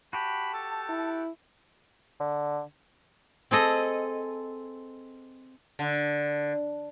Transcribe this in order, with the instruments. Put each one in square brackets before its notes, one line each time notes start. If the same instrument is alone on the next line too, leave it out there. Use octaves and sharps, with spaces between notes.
[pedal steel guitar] F#4 G4 [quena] A5 [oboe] B5
[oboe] A4
[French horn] E4
[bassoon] D3
[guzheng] C4 G#4 A4 D#5
[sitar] D3